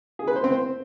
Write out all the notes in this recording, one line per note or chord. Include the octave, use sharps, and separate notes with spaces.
G#4
B4
C5
C4
C5